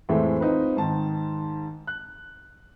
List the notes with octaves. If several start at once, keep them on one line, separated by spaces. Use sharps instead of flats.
F2 A2 E3 G#3 C4
C4 D#4 F4 B4
G#2 D#3 A5
F#6